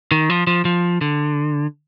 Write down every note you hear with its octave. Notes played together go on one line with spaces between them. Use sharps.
D#3
F3
F3
F3
D3